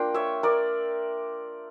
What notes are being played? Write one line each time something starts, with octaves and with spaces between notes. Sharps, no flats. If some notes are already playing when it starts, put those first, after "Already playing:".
Already playing: A#3 D4 F4 G5
C#5 E5
A#4 D5